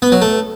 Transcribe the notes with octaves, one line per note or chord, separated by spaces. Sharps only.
B3
F#3
A3